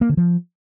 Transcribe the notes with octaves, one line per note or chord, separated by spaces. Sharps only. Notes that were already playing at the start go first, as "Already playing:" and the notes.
A#3
D3
F3